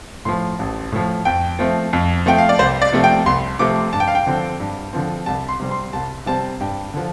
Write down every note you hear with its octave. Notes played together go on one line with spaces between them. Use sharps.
A2 F3 C6
A1
A2 F3
F2 G5
F3 A3 C4
F2
F3 A3 C4 G5
F5
D5
C2 C5
D5
C3 F3 A3 C4
G5
C2 C6
C3 F3 A3 C4 D6
G2 A5
G5
F5
G5
D3 F3 C4
G2
D3 F3 C4
C2 A5
C6
C3 G3 C4
C6
C2 A5
C3 G3 C4 A5
G2 G5
D3 F3